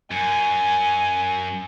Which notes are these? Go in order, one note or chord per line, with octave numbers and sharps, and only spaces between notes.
F#2 G#5